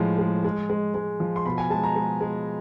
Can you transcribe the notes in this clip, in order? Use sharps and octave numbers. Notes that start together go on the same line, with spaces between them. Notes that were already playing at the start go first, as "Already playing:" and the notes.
Already playing: A2 F3 G#3
G#3
G#3
G#3
G#3
F3
C6
B2 B5
G#5
G#3 A5
A#5
G#3
G#3